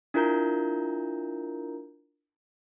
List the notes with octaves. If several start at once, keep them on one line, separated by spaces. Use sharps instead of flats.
D4 E4 F4 A#4 A#5 G6